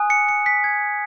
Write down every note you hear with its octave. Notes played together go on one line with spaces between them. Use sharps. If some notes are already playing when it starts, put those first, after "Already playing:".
Already playing: G#5 D#6 F#6
C#7
C#7
B6
G#6